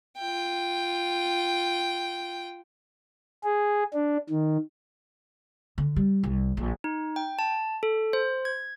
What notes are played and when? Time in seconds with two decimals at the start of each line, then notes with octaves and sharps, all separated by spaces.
0.18 F4 G5
3.43 G#4
3.94 D4
4.30 D#3
5.78 D3
5.96 G3
6.23 C2
6.57 A#1
6.84 D#4
7.16 G5
7.39 A5
7.83 A4
8.13 C5
8.45 G#6